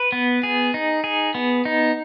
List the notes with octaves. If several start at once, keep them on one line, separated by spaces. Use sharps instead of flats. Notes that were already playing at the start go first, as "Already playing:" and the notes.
Already playing: B4
B3
G#4
D#4
G#4
B3
D#4